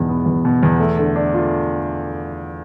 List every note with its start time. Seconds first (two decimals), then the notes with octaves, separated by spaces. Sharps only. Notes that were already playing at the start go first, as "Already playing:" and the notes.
Already playing: E2 G#2 B2
0.09 B3
0.26 E2
0.45 B2
0.63 E2
0.80 A3
0.98 D3
1.16 D4
1.34 F4